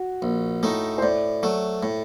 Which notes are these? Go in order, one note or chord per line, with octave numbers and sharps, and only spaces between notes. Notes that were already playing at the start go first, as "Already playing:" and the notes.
Already playing: F#4
A#1
A2 A3 D#4
C5
A2 D5
F#3 A3
A2